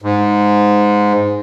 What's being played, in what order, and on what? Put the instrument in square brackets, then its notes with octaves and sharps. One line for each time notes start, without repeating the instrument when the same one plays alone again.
[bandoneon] G#2